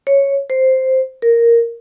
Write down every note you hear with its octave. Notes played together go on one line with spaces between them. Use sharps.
C#5
C5
A#4